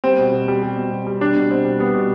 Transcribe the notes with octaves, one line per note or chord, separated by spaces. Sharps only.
G3 C4
B2
B2
G3
G3
B2
B2
G3
G3 D4
B2
B2 C4
G3
G3 B3
B2